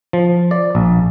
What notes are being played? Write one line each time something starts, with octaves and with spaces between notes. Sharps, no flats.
F3
D5
A#1